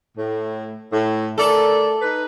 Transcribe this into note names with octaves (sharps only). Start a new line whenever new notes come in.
A2
A2
A3 A4 A#4 D5
D#4 B4